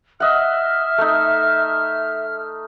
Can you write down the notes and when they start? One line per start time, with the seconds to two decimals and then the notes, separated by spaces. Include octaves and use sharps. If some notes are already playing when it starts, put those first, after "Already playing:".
0.20 D#5 E5 F#5 F6
0.98 A3 D#4